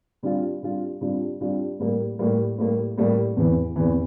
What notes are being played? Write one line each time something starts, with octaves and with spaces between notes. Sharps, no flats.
C3 G3 D4 F4
C3 G3 D4 F4
C3 G3 D4 F4
C3 G3 D4 F4
A2 G3 A#3
A2 G3 A#3
A2 G3 A#3
A2 G3 A#3
E2 C3 E3
E2 C3 E3